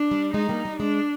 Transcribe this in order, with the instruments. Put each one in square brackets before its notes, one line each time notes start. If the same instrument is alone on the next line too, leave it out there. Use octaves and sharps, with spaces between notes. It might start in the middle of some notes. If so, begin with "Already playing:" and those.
Already playing: [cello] D4
[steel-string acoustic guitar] G3
[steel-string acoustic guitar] G#3 [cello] D#4
[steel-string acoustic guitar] G3 A#3
G3
[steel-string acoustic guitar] G#3 [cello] D4